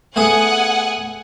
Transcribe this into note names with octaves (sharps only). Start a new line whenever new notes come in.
A3 B3 G#4 F#5 G#5